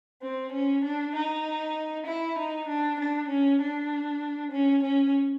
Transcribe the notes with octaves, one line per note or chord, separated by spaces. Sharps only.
C4
C#4
D4
D#4
E4
D#4
D4
D4
C#4
D4
C#4
C#4